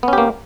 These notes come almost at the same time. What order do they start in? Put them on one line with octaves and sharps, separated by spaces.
B3 C#4 G4 A#3